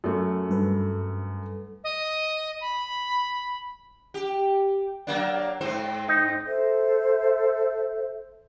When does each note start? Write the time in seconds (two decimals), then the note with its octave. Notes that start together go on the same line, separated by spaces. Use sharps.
0.04 F#2 A3
0.50 G2 A4 B4
1.84 D#5
2.61 B5
4.14 G4
5.07 F#3 A#3 D4
5.61 G#2 C4 C5
6.08 D#4
6.47 A4 C5 E5